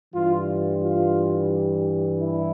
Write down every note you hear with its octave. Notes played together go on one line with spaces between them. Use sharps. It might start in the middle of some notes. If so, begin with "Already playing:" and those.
G2 E3 G3 F4
F4
E4